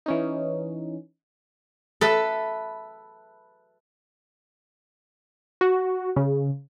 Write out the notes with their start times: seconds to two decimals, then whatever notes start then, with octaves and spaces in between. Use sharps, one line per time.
0.06 E3 C#4 D#4
2.01 A4 B4 E5
5.61 F#4
6.16 C#3